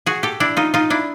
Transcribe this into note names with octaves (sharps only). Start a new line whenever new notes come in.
F#4 G#4
G4 A4
D4 E4
D#4 F4
D#4 F4
D4 E4